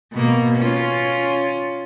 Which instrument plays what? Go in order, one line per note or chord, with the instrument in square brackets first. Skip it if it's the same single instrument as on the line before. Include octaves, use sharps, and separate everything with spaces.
[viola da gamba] B2 A#3
C#4 F4